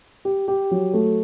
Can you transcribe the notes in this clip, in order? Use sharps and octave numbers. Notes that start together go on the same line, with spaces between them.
G4
G4
F#3
A3